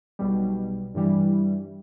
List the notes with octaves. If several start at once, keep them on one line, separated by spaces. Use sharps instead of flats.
B1 B2 G3
G2 E3 G3